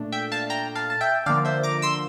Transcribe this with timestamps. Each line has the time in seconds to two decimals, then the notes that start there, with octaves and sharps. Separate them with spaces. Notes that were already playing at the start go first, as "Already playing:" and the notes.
Already playing: A#2 A3 D4
0.12 E5 G5
0.32 F5 A5
0.50 G5 A#5
0.75 F5 A5
0.90 A5
1.01 E5 G5
1.26 D3 F3 A#3 D4 D5 F5
1.45 C5 E5
1.63 A#5 D6
1.82 C6 E6